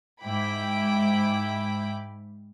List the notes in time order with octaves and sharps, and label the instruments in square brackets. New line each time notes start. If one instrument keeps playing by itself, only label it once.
[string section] G#2 E4 G5 B5 D6